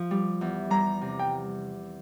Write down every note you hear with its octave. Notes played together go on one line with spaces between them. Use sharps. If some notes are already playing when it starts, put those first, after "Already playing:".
Already playing: F3 F4
G3
E2
G3 A#5
C3
G5